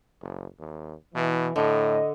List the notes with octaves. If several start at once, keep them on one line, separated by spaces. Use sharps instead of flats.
F#1
D#2
B2 E3
A2 D3 D#5